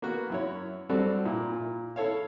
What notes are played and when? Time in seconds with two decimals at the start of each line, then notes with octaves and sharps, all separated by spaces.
0.02 A#3 B3 F#4
0.30 F#2 E4 C#5
0.89 G3 C4 D4 F#4 A4
1.25 A#2 E4
1.52 A#2
1.96 E4 A4 C#5 F5